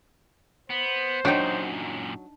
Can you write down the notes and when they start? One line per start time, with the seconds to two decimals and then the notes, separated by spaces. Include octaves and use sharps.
0.70 B3 C5
1.25 F#2 A#2 F#3 D4 D#4 G5